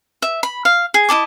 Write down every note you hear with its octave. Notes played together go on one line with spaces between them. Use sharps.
E5
B5
F5
G#4
E4 D#5 A5 D6